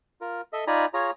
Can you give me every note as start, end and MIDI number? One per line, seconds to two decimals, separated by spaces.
0.21 0.41 65
0.21 0.41 70
0.53 0.64 69
0.53 0.64 75
0.53 0.64 76
0.67 0.85 63
0.67 0.85 65
0.67 0.85 74
0.67 0.85 80
0.67 0.85 82
0.67 0.85 83
0.94 1.11 65
0.94 1.11 68
0.94 1.11 73
0.94 1.11 82